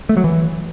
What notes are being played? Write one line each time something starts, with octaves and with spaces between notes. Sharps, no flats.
A3
F#3
E3